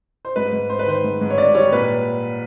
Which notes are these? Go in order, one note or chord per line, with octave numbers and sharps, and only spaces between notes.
C5
G#2 B4
G#2
G#2 C5
B4
D#3 C5
G#2
G#2
C#5
G#2 D5
G3 C#5
A#2 B4